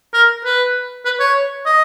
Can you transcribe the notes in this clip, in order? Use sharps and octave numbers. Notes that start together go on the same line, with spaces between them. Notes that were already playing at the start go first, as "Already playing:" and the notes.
A#4
B4
B4
C#5
D#5